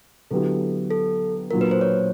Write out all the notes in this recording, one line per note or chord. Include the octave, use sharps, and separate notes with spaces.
D3 F#3 B3 E4 G4 A4
A4
A#2 F#3 A#3 D4 F4 A#4
B4
C5
C#5